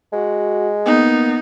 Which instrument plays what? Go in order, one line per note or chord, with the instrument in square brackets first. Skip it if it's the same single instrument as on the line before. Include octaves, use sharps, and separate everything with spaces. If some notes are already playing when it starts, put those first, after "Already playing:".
[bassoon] G#3 [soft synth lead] F#4
[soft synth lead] A#3 [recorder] B3 [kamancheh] D#4